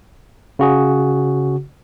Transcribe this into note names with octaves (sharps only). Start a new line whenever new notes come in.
C#3 F#4 G#4